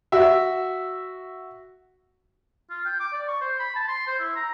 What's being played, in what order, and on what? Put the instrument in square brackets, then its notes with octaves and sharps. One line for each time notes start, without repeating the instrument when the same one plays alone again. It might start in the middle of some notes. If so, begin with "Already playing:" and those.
[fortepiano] F#4 E5
[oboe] F4
G5
D6
D5
C#6
C5
B5
A5
C6
C5
E4
A#5